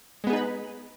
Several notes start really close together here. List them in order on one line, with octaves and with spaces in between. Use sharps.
G#3 B3 G#4 D#4 B4